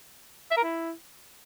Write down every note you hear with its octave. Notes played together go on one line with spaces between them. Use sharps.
E5
A#4
E4